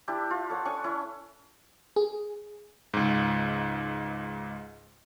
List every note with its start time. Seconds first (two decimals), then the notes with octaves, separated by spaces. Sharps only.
0.08 D4 E4 G4
0.30 F4
0.50 A4 C#5 F#5
0.65 C#4 D4 C#6 D#6
0.84 C#4 E4
1.96 G#4
2.94 C#2 G#2